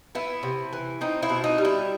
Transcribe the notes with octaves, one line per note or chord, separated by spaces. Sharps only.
B3 E4
C3
E3
C4 D#4
E4
B2
D#4
G3
E4